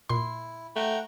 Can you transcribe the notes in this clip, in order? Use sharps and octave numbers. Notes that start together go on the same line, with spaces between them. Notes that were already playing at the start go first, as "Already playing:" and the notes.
A#2 E4 C6
A3 F#5 G5 A#5